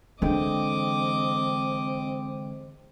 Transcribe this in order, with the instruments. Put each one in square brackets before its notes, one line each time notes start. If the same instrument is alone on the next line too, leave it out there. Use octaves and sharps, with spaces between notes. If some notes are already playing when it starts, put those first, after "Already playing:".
[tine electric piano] D3 G#3 G5 [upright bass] E3 D4 [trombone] C4 [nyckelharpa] D#5 D6